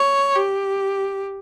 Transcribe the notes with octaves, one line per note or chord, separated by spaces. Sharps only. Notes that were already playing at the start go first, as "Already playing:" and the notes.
Already playing: C#5
G4